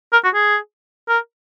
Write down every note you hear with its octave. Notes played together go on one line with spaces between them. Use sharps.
A#4
F#4
G#4
A#4